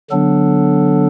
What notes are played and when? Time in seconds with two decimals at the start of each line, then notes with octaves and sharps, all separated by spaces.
0.11 D3 F#3 B3 D4 A4